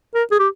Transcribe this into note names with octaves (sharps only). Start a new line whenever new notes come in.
A#4
G#4
G4